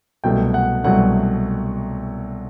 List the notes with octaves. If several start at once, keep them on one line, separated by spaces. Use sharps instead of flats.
C2 B2 F#3 A3 G5
F#5
C2 B2 F#3 A3 F#5